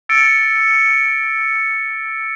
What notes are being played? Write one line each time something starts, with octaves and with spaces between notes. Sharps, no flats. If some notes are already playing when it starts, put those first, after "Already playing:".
E6 A6 C#7 D7